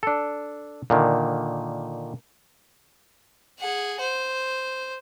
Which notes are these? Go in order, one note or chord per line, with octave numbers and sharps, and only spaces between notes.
D4 A4
A#2 D3 D#3
G#4 F#5
C5